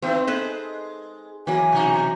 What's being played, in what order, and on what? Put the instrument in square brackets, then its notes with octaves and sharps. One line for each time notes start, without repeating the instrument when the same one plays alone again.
[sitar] E3 A3 [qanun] C4 D#4
[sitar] G#3 [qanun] A4 B4 C5
[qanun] E3 F#3 [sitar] A#3 [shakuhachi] G#5
[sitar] B2 D#4